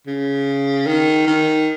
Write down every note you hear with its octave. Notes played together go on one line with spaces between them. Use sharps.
C#3
D#3
D#3